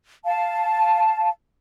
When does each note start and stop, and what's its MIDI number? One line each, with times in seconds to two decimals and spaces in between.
0.24 1.29 77
0.24 1.29 81